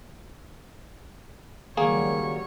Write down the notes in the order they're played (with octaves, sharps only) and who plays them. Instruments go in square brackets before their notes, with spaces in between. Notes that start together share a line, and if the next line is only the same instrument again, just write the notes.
[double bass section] C#2 F#3 G3 [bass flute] D#3 [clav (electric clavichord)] A#3 G#4 [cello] C#5